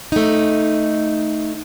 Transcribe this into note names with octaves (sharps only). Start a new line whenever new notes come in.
A3 D#4